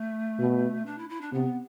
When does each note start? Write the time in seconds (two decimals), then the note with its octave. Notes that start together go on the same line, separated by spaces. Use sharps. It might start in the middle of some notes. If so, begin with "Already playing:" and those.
Already playing: A3
0.39 B2
0.86 D4
0.98 E4
1.09 E4
1.21 D4
1.32 C3 B3